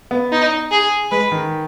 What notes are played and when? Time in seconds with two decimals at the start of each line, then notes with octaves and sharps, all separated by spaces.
0.11 B3
0.32 D#4
0.71 G#4
1.11 G#3 B4
1.32 D#3